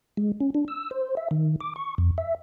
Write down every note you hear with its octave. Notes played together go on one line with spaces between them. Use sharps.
G#3
C#4
D4
E6
C5
E5
D#3
D6
C#6
F2
E5